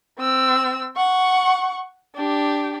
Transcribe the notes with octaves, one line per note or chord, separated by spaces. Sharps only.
C4 E6
F#5 C#6
D4 G4